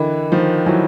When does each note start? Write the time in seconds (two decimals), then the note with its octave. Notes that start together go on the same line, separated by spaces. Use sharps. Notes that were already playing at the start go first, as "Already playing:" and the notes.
Already playing: D3 E3 A#4 D#5 G5 B5 D6
0.32 D#3 F3
0.66 E3 F#3